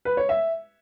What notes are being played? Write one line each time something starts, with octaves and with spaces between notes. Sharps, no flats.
B4
C#5
E5